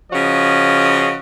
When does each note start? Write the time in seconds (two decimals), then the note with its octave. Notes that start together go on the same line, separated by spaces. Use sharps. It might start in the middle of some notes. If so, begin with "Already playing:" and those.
0.12 C#3 F3 F#4 C#5 D#5